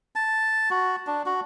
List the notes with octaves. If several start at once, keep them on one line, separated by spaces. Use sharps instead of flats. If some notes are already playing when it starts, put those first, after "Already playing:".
A5
F#4
D4
F#4